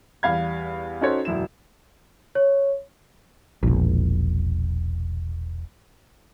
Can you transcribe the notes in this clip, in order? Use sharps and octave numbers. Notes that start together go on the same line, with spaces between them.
E2 G3 F5 B5 G#6
C#4 D#4 F#4 A4 C5 C#5
E1 F#2 E4 E7
C#5
E1 A#1